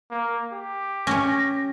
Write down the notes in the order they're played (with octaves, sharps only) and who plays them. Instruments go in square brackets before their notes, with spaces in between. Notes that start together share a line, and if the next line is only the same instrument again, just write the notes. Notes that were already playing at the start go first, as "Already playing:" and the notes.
[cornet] A#3
G4
[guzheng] C#4 C#5 [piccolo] A#6